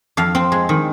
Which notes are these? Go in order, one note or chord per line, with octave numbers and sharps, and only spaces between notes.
F2 F5
C4
G#3
D#3